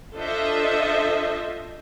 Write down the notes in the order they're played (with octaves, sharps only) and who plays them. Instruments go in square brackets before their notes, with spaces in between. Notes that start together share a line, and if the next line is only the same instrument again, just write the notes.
[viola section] D4 F4 A4 C5 D#5 E5